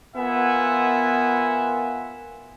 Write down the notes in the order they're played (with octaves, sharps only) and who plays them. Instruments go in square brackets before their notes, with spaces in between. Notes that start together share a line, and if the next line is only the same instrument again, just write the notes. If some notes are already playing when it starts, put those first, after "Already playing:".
[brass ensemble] B3 F4 A#4 E5 F#5 G#5